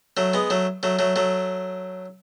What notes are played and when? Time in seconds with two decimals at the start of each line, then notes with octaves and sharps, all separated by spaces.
0.17 F#3 A3
0.34 G#3 B3
0.50 F#3 A3
0.83 F#3 A3
0.99 F#3 A3
1.16 F#3 A3